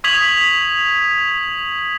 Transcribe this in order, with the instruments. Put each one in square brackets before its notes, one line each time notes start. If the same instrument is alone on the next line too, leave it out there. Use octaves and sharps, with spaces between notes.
[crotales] C#6 D#6 G#6 B6 F7 F#7